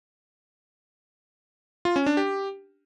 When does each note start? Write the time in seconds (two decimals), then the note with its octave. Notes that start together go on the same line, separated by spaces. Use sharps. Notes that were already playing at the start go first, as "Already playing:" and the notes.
1.85 F4
1.96 C#4
2.06 D4
2.17 G4